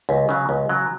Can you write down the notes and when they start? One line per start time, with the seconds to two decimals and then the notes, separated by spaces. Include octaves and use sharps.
0.09 C#2
0.29 C#3 F#3
0.49 C#2
0.69 C#3 F#3